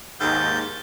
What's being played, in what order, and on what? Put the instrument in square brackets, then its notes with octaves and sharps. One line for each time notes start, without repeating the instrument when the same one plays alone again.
[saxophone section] D#2 G#2 [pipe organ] G6 A6